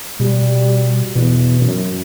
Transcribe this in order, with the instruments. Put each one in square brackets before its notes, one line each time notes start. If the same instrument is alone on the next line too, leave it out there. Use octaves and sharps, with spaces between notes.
[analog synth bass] B2 [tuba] G3
[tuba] E2 [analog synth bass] B2
[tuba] F#2